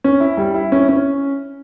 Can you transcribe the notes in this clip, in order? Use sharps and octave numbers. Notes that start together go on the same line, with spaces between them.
C#4
E4
G3
E4
C#4
C#4